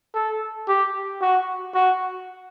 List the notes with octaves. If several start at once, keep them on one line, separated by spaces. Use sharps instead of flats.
A4
G4
F#4
F#4